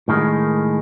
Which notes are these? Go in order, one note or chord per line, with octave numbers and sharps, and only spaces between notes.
A2 D#3 G#3